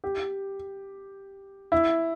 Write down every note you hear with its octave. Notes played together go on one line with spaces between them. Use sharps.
G4
E4